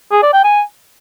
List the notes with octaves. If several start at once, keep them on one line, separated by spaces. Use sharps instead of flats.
G#4
D5
G5
G#5